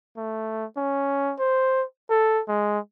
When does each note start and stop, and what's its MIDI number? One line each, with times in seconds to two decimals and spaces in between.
0.17 0.65 57
0.77 1.34 61
1.39 1.84 72
2.10 2.42 69
2.48 2.79 56